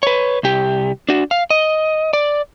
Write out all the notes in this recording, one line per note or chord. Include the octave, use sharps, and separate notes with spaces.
B4 C#5
C2 G4
D4 F#4
F5
D#5
D5